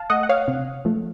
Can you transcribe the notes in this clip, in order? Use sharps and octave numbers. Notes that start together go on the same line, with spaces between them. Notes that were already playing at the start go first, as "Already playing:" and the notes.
Already playing: F5 A5
A3 D#5 F#5
F#5
C#5 F5
C3
F3 A3